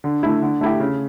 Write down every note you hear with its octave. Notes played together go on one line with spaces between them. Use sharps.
D3
A3 E4
D3
A3 E4 G4
C#3